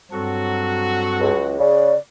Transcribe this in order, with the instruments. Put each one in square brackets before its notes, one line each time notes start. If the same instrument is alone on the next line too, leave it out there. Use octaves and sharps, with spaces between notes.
[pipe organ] G2 C4 A4 [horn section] F#3 F#4
[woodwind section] C#2
[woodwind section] C#3 [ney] D5